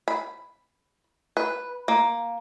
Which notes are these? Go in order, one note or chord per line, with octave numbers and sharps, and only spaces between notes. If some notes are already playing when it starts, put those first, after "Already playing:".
B5
B4
A#3